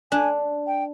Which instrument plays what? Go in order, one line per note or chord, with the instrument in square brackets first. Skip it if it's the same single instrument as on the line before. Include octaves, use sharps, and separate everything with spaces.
[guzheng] D4 [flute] G#5
[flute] G5